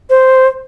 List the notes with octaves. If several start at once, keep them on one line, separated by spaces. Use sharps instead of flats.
C5